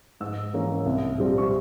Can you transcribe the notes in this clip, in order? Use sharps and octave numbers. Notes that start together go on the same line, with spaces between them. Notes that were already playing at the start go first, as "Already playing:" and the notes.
G#2 E6
E3 A#3 C#4
C2
A#2 G3 C4
C#6